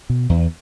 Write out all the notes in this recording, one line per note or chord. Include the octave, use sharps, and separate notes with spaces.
B2
E2